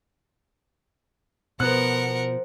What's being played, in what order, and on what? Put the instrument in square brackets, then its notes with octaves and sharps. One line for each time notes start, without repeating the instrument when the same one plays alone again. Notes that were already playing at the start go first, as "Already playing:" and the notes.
[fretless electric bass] B2 [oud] F3 [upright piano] B3 F#6 [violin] A#4 F#5